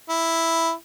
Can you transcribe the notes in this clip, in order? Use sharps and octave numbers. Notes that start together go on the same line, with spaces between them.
E4